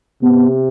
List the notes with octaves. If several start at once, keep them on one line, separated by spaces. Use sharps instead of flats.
C3 B3